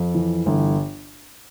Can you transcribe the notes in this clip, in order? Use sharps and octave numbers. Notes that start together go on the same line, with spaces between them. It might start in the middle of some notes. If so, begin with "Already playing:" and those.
Already playing: F2
E3
G1